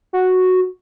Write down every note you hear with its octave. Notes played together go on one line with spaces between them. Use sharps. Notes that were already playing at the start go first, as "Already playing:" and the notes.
F#4